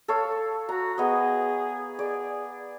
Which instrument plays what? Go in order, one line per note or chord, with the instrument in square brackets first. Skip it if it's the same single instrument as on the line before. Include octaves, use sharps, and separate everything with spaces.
[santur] A4 C#5 F5
[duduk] F#4 [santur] A#5
[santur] B3 D#5 [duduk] G#4
[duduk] G#4 [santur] D5